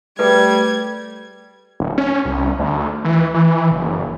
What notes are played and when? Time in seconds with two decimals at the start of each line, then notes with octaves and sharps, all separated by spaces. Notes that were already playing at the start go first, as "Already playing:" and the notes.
0.19 G3 A3 G#4 A4 B4 G#6
1.80 D1
1.98 C#4
2.25 C2
2.59 D2
3.04 E3
3.34 E3
3.71 F#1